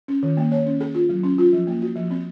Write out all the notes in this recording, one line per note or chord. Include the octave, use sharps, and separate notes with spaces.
C#4
D#3
A#3
C#5
C#4
G#4
F4
F#3
C#4
F4
F3
A#3
F#4
F3
C4